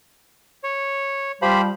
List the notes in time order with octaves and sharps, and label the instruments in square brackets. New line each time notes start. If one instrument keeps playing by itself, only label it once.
[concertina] C#5
[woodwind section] F3 G3 [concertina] G4 C5 B5